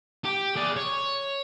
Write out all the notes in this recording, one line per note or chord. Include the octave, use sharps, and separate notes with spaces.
G4
G#4 D5
C#5